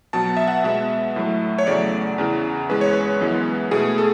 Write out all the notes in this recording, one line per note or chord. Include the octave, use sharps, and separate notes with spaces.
B2 F#3 B3 A5
E5
F#5
B2 G#3 B3 E5
A2 F#3 A3
C#5
E2 C#3 F#3 A3 D5
E2 C#3 E3
E2 C#3 G#3 B4
C#5
B4
F#2 E3 G#3 B3
B2 A3 G#4
A4